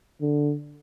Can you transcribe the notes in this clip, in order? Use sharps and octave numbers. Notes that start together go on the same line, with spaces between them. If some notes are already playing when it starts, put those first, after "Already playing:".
D3